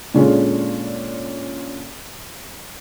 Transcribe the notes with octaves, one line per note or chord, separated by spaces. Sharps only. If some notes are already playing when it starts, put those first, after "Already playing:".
A#2 D3 G#3 C#4 F4